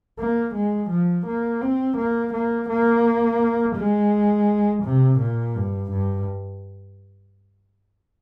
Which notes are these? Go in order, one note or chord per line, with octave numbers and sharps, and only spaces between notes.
A#3
G#3
F3
A#3
C4
A#3
A#3
A#3
G#3
C3
A#2
G2
G2